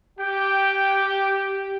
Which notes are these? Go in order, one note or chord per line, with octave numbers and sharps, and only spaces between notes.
G4 G5